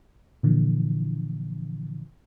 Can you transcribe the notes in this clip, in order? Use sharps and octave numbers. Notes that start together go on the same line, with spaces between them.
A#2 D3 E3 F3